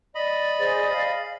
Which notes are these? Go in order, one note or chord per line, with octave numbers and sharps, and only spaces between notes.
D5 D#5 B5
G#4 C5
F5